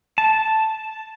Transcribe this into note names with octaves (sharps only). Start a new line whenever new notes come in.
A5